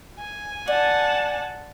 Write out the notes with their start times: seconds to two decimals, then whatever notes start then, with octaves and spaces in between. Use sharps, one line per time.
0.19 G#5
0.68 D5 F#5 A5